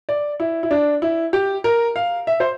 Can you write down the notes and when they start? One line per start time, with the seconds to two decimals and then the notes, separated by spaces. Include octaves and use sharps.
0.09 D5
0.40 E4
0.63 E4
0.71 D4
1.02 E4
1.33 G4
1.64 A#4
1.96 F5
2.27 E5
2.40 C5